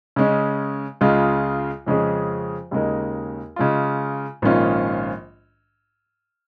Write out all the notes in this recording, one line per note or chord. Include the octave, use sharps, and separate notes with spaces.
C#3 G#3 C#4
C#2 C#3 G#3 F4 G#4
F2 C#3 G#3 C#4 G#4
D#2 C#3 G#3 D#4 A#4
C#3 G#3 F4
A#1 G#2 D#3 C#4 F4